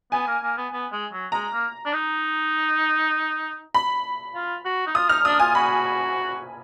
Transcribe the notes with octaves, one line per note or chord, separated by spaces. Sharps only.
B3 G#5
A#3
A#3
B3
B3
G#3
F#3
G#3 A#5
A#3
D4
D#4
B5
F4
F#4
D#4
F4 D#6
D#4 F6
D4 D#6
F4 G#5
F#4 B5